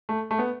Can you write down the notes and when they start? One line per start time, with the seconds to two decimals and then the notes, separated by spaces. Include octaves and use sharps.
0.09 A3
0.31 A3
0.39 B3